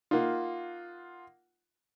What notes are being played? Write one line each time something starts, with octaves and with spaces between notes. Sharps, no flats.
A#3 D#4 F4 F#5